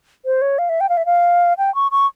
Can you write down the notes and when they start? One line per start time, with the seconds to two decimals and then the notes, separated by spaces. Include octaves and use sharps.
0.25 C5
0.42 C#5
0.59 F5
0.69 E5
0.81 G5
0.89 F5
0.97 E5
1.06 F5
1.58 G5
1.75 C#6
1.91 C#6